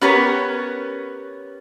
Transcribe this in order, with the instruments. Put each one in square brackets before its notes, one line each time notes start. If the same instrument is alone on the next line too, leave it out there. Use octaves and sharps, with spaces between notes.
[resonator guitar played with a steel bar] B3 C#4 G4 A#4 B4 C#5